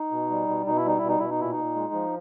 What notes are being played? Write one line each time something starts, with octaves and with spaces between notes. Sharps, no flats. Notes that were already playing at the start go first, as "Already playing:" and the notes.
Already playing: D#4
B2
G3
B2
B2 D#4
E4
G3 D#4
E4
B2
D#4
B2 E4
D#4
A#2 E4
D#4
A#2
G#3
F3